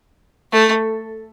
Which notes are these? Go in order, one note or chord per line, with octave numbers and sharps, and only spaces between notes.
A3